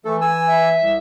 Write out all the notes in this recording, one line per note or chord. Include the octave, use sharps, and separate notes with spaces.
E3 A3 A4
G#5 E6
E5
C2